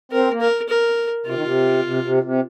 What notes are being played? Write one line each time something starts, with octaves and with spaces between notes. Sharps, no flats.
C4 A#4
A#3
A#4
A#4
C3 F4
D#3
C3
C3
C3
C3